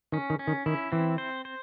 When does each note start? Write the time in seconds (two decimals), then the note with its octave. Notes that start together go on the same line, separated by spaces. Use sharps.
0.12 D#3 C#4
0.30 D#3
0.39 C#4
0.48 D#3
0.66 D#3 E4
0.92 E3 C4
1.18 C5
1.45 C5